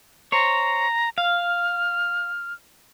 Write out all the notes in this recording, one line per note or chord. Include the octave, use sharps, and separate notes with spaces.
C5 C#5 A#5
F5 F6